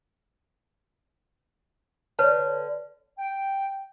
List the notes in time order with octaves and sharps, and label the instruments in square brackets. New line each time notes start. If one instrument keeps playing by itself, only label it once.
[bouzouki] D3 [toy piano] B4 C#5 A5
[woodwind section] G5